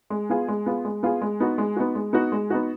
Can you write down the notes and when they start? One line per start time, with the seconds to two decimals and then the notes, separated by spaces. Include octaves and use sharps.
0.10 G#3
0.30 B3 F4 G#4
0.48 G#3
0.66 B3 F4 G#4
0.85 G#3
1.03 B3 F4 G#4
1.21 G#3
1.40 B3 D#4 F#4
1.58 G#3
1.76 B3 D#4 F#4
1.95 G#3
2.13 B3 D#4 F#4
2.32 G#3
2.50 B3 D#4 F#4